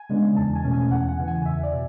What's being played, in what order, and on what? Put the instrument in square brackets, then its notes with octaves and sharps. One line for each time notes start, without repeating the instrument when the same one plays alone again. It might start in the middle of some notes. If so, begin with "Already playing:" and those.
Already playing: [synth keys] G#5
C#3 G#3 B3 D4
E2 A5
G#5
B2 A3 C#4
G#5
E2 F#5
F#5
C#3 E3
G#5
E2 E5
D5
B2